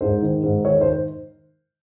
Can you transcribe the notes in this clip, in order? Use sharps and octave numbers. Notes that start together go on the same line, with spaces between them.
G#2 C5
D#3
G#2
D#3 C#5
C5